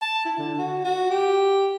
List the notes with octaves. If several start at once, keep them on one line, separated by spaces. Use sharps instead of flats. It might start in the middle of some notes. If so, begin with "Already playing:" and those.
A5
E4
D3
F#4
F#4
G4